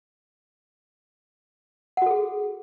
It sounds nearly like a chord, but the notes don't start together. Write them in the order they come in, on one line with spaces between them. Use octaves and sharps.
F#5 F#4 A4 G#4